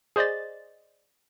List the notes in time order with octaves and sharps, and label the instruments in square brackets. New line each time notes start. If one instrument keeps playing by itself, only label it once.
[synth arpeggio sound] G#4 C5 D5 D#5 A6